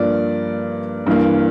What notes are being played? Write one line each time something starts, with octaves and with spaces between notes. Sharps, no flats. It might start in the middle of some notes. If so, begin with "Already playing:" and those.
Already playing: G2 F3 A#3 D5
G2 E3 A#3